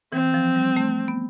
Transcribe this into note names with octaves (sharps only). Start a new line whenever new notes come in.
E3 C4
F3
G3
A3
B3